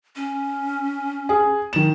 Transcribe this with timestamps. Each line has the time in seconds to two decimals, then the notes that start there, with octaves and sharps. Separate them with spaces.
0.16 C#4
1.29 G#4
1.73 D#3 E7